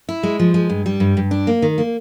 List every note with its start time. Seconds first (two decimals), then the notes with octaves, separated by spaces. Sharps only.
0.09 E4
0.23 G#3
0.39 F3
0.54 G#3
0.70 G2
0.86 G3
1.00 G2
1.17 G2
1.31 D4
1.47 A#3
1.62 D#3
1.78 A#3